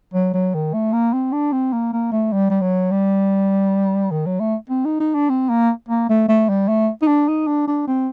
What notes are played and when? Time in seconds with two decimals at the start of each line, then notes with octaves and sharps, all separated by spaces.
0.14 F#3
0.34 F#3
0.54 D#3
0.73 A3
0.93 A#3
1.13 C4
1.32 D4
1.52 C4
1.73 A#3
1.93 A#3
2.12 A3
2.33 G3
2.50 G3
2.61 F#3
2.91 G3
4.11 D#3
4.26 F#3
4.40 A3
4.70 C4
4.85 D#4
5.00 D#4
5.14 D4
5.29 C4
5.49 A#3
5.89 A#3
6.09 A3
6.28 A3
6.49 G3
6.68 A3
7.02 D#4
7.07 D4
7.28 D#4
7.47 D4
7.67 D4
7.87 C4